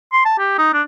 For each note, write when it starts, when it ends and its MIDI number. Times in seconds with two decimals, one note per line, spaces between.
0.13 0.21 84
0.25 0.36 81
0.38 0.56 67
0.58 0.71 63
0.73 0.82 62